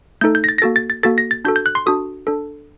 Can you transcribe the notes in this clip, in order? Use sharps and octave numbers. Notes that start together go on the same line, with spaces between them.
A3 D#4 A4 G6
G6
A#6
A6
A#6
A#3 F#4 A4 A6
A6
A6
A#3 F#4 A4 A6
A#6
A6
D4 F#4 A4 G6
G6
F#6
C6
D4 F#4 A4 D#6
D4 A4